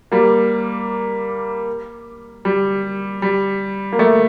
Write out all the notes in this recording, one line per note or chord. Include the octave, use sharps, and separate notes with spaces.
G3 A#3
G3
G3
A#3
A3